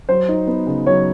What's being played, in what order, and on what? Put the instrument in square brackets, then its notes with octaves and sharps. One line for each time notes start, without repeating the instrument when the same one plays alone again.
[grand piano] F#3 [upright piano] C5
[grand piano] D#4
B3
C#3
[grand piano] F#3 [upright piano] C#5